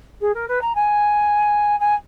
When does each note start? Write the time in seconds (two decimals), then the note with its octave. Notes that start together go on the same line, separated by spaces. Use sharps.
0.21 G#4
0.34 A#4
0.48 B4
0.61 A#5
0.75 G#5
1.80 G#5